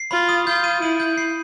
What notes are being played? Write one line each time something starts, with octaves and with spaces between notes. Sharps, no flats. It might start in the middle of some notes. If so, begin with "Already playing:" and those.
Already playing: C7
F4 B5
D#6
F4 G6
D#7
E4 D#7
G6
C7